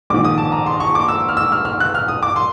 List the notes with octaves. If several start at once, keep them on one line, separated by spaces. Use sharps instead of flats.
A#1 G#2 D#3 D6
D#6
A5
A#5
C6
C#6
D6
E6
F6
E6
F6
F6
F#6
F6
D#6
D6
C6